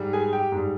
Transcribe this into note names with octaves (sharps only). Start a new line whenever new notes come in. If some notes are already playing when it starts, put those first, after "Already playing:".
Already playing: G#2 G3
G#4 G#5
G4 G5
G#2 G3